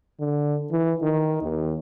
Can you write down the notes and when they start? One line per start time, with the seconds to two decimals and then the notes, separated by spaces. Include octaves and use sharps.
0.20 D3
0.71 E3
1.02 D#3
1.42 D#2